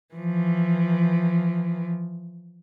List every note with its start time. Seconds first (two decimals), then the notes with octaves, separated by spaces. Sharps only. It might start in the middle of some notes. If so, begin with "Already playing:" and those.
0.14 E3 F3